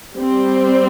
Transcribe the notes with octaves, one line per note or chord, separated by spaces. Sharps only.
G3 C4